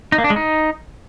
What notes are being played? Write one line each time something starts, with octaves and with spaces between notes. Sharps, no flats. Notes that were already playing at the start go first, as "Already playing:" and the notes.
D#4
A#3
D4
G#3
D#4